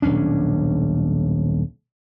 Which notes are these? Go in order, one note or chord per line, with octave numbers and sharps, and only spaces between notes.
D#1 B1 C#4 D4